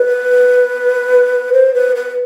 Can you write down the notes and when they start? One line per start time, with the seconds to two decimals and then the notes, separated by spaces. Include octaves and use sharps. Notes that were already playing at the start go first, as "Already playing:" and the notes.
Already playing: B4
1.53 C5
1.74 B4
1.96 B4